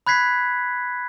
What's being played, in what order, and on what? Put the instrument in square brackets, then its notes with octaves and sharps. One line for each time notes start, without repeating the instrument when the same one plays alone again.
[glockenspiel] B5 F#6 G#6 B6 C7